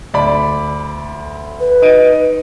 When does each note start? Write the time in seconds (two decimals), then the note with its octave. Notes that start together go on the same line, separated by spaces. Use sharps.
0.14 D2 D5 B5
1.60 B4
1.82 D#4 D7 D#7